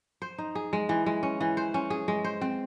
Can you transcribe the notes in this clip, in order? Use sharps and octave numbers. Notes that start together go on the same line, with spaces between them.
C5
D#4
G#4
G#3
E3
G#3
C#4
E3
C5
C#4
G#4
G#3
C5
C4